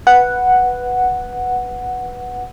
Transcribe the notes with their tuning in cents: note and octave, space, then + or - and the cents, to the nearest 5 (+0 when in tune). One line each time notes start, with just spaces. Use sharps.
B4 +0 F#5 +0